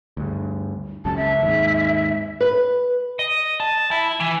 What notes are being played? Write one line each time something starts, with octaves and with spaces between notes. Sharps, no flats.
D2 G2
C#2 F#2 C#3 A5
E5
D#2 G#2
B4
D#5
A5
E4
E3